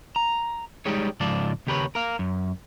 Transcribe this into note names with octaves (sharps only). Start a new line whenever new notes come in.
A#5
G3 G#3 D#4 G4 G#4 C#5
C#2 G#2 F3 F4 D5 A5
D#2 C#3 G4 A#4 B4 C#5
A#4 F5
F#2